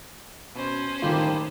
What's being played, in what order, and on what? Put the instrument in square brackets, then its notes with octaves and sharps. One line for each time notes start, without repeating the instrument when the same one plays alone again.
[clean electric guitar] B2 [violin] C#4 C5
[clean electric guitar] A2 G3 G4 [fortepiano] D#3 F4